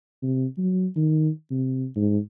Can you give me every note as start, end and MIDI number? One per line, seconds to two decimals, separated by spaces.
0.22 0.46 48
0.58 0.87 54
0.96 1.29 51
1.51 1.86 48
1.96 2.19 44